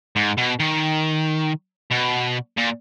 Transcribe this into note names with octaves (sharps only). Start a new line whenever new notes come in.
G#2
B2
D#3
B2
A#2